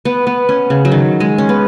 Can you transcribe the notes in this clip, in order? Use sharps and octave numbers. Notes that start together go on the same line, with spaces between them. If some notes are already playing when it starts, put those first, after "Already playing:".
B3
B3
C#4
C#3
F#3
D#3
G#3
C#4
B3